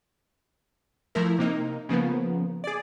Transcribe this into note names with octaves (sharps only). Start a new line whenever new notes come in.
F3 A3 E4 A#4
C3 A#3 D#4
C#3 F3 A#3 B3
G#4 D5